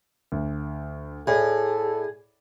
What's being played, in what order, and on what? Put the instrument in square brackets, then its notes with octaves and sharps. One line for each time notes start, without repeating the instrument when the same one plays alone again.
[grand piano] D2
[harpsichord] A2 [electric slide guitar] G#4 [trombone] A4 [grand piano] D5